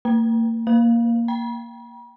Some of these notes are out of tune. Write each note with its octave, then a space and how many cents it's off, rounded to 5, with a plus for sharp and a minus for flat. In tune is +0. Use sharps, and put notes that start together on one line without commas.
A#3 -35 G5 +0
A#3 +0 F5 +0
G5 +0 B5 -45